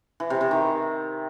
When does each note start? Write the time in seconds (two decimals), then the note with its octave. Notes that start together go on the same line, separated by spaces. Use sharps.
0.20 E3
0.30 C3
0.41 C3
0.51 D#3